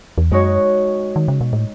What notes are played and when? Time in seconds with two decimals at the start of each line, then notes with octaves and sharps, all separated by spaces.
0.18 E2
0.31 F#2 G#3 D#4 F#4 C#5
1.16 D#3
1.28 C#3
1.41 B2
1.53 A2